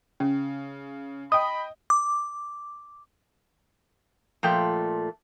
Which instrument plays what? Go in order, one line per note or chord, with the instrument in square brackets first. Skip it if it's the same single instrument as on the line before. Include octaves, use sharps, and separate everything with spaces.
[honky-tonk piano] C#3 [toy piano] C#4
[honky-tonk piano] D#5 G5 [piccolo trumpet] B5 [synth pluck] D#6
[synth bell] D6
[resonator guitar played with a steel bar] A#2 F3 A3 G5